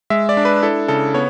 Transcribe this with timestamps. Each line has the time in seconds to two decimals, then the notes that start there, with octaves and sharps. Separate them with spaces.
0.10 G#3 E5
0.29 D5
0.37 D4
0.45 B4
0.62 E4 A4
0.88 C#3 A4
1.14 B3 C#5